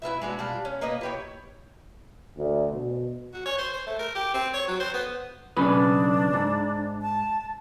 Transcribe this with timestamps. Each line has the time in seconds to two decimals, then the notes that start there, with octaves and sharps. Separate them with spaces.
0.02 E4 F4 B4 E5
0.22 G#3 D4 F#4
0.39 G3 D4 F4
0.65 C#4
0.81 A#3 B4 D#5 A#5
1.01 E4 G4 C#5
2.37 D2
2.73 B2
3.33 F#4
3.45 C#5
3.58 C5
3.73 C5
3.87 A3
3.99 A#4
4.15 G4
4.34 C4
4.53 C#5
4.67 F#3
4.80 C5
4.94 B3
5.57 B1 C#3 D4 B4
6.33 G#2
7.02 A5